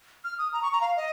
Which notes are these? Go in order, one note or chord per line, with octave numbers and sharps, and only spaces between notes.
F6
D#6
A#5
C#6
A#5
F5
D#5